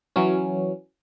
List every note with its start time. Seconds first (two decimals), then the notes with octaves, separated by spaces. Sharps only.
0.16 E3 F#3 C#4